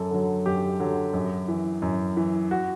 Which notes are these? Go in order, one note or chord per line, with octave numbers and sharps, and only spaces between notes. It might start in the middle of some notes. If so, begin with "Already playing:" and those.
Already playing: F#2 A4
D3 F#3
F#2 G4
D3 F#3
F#2
E3
F#2
E3
F#4